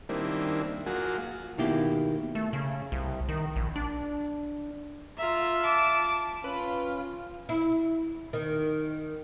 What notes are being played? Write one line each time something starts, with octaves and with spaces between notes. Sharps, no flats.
D#3 G3 A#3 C4 D4 E4
F#3 A#3 F4 F#4 G#4
B2 D#3 A#3 E4 G4
A3
C#3
C2
D#3
A#1
D4
F4 E5 A#5
A5 D6
C#4 F4 B4
E4
D#3